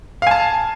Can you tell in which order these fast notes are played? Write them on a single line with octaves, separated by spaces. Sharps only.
F5 G#5 A5